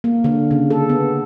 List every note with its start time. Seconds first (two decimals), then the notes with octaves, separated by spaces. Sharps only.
0.04 A#3
0.24 D3
0.51 C#3
0.70 A4
0.89 B3